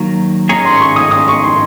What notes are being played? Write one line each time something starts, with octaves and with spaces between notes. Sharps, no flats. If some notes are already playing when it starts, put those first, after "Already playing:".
Already playing: D#3 F#3 A#3
D#3 G#3 C#4 G#4 C#5 A#5
C6
C#6
D#6
D#6
C#6
C6